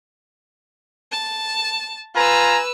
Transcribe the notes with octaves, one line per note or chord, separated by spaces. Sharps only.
A5
F4 B4 G#5 A#5 E6